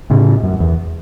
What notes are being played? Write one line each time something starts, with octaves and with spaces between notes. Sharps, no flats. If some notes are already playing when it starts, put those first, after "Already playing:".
A2 C#3
F#2
E2